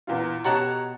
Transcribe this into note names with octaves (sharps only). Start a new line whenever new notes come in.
E2 A#2 F4
B2 G4 C#5 F#5 A5 A#5